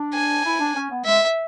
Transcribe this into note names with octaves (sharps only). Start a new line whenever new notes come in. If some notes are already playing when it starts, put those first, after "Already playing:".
Already playing: D4
G#5
E4
D4
C#4
B3
G#3 E5